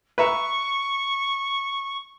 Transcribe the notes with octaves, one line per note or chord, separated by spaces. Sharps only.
B4 E5 A#5 C#6